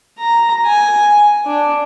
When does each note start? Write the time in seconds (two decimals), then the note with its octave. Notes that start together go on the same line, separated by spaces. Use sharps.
0.18 A#5
0.66 G#5
1.46 D4